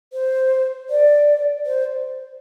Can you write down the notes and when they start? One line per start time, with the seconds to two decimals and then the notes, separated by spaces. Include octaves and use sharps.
0.13 C5
0.90 D5
1.66 C5